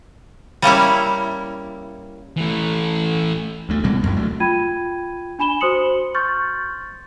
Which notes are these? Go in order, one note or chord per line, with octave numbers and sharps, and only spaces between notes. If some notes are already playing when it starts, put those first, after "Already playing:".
G3 A#3 C#4 E4
E3 A3
D2 A3
B2 G3 G#3 C4
A1 F#2 A#2 G#3
D2 F#3 A3
F4 G5 B5 G#6 D#7
D4 G#5 B5 E7 G7
F#4 C5 C6 D#6 C#7 F#7
C6 C#6 F6 G6 A6